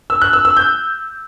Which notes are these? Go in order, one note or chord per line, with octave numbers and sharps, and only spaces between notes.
E6
F#6
E6
E6
G6